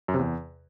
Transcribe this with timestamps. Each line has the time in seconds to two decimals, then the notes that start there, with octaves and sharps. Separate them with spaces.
0.08 F#2
0.14 C3
0.19 E2